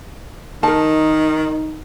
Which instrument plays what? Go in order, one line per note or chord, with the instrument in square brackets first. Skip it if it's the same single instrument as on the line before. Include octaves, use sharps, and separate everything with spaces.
[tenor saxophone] D#3 [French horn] D#4 [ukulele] A#4 A5